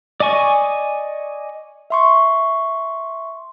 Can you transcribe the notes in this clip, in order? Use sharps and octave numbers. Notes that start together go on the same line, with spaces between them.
D5 D#5 G#5 C#6
E5 C6 C#6